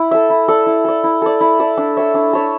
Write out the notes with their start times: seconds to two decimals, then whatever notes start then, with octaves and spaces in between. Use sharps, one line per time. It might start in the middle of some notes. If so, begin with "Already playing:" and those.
Already playing: E4
0.11 A4 E5
0.30 E4
0.48 A4 D5
0.66 E4
0.85 A4 D5
1.04 E4
1.22 A4 D5
1.41 E4
1.60 A4 D5
1.77 D4
1.97 A4 C#5 E5
2.14 D4
2.33 A4 C#5 E5